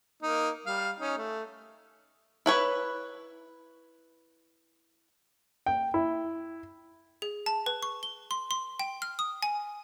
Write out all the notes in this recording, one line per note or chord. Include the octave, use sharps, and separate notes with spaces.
A#3 D#4
G3 F5
C#4 D#4
A3
E4 B4 C#5
G5
E4
G#4
A5
B4
C#6
G7
C6
C6
G5
F6
D#6
G#5